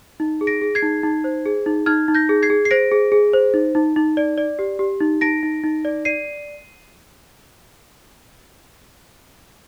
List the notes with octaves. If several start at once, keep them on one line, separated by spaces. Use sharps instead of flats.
D#4
G#4
A#6 D7
G#4
G#6 C7
D#4
D#4
C5
G#4
D#4
D#4 F6 G#6
D#4
G6 A#6
G#4
G#6 C7
G#4
C7
C5 A#6 D7
G#4
G#4
C5
D#4
D#4
D#4
D5
D5
G4
G4
D#4
D#4 A#6 D7
D#4
D#4
D5
D5 C7 D#7